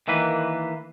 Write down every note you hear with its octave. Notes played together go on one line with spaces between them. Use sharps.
D#3 E3 A#3 B4